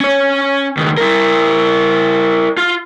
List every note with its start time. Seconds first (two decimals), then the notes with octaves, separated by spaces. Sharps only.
0.01 C#4 C#5
0.77 C#2 D#3
0.98 E4 A#4
2.57 F4